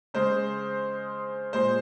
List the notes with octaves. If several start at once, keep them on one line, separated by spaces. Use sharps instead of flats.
C#3 G#3 C5
A#2 G#3 C5